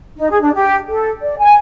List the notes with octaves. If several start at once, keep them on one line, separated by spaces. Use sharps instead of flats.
D#4
G#4
D4
G4
A4
D5
G#5